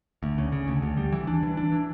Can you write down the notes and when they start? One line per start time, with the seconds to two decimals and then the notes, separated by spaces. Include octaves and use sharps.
0.23 D2
0.38 C#3
0.52 C#3
0.68 D2
0.82 D2
0.97 G3
1.12 E3
1.27 D4
1.43 E3
1.57 D4
1.72 E3